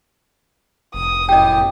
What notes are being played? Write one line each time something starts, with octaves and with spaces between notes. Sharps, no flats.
F1 D#6
F#2 A2 G4 D#5 G5